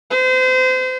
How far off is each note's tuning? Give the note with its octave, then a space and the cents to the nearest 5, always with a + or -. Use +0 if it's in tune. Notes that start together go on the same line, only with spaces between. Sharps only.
C5 -30